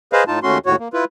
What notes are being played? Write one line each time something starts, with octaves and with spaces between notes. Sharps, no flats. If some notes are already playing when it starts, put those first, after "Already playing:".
G#4 B4 C5 D#5 F5
A2 D#4 F4 A5
D#2 A3 C#4 F#4 C6
D#2 A2 F#4 C#5
A#3
E4 F4 B4